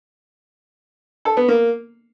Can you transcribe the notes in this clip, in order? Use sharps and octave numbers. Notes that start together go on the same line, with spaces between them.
A4
B3
A#3